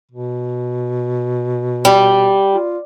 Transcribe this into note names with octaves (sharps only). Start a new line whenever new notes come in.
B2
G3
F4